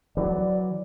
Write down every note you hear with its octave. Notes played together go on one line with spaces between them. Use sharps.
E3 F#3 D5